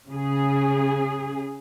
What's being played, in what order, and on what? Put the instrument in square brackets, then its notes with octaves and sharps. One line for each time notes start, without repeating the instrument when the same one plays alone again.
[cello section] C#3 G#4